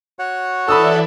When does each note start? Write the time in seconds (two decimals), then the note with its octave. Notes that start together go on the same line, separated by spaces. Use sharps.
0.19 F#4 C#5 F#5
0.69 E3 A4 D5 E5 B5 D#6 E6